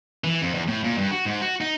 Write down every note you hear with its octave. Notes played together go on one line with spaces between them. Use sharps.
E3
F2
E2
A2
A#2
G2
F#4
G#2
F#4
D#4